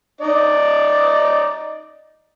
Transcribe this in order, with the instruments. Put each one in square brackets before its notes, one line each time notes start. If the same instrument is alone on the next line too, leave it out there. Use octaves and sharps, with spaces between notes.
[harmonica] D#4 D5 D#5